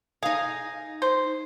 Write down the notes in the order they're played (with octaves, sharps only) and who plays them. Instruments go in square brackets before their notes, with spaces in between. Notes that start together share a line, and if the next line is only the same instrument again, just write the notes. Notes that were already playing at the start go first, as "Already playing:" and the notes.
[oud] D#4 F5 [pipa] G#4
[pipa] C5